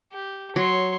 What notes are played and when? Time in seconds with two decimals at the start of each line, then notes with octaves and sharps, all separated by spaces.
0.12 G4
0.56 F#3 C#5 C6